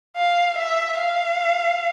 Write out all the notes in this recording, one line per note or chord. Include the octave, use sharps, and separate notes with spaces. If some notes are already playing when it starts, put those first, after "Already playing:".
F5
E5
F5